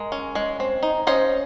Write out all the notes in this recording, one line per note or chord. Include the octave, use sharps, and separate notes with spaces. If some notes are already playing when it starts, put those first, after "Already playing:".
Already playing: G#3 A#4
C#4
G#3
C4
D#4
C#4 C5 D#5